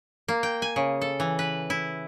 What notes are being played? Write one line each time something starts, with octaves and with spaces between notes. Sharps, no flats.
A#3
G5
G#5
C#3
A4
E3
B4
E4